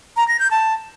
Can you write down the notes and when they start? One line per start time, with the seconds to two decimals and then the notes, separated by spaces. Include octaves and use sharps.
0.17 A#5
0.28 A#6
0.39 G6
0.51 A5